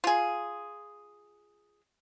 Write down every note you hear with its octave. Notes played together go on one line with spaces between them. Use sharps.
F4 G#4